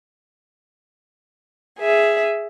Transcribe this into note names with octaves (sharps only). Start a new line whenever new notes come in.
G#4 E5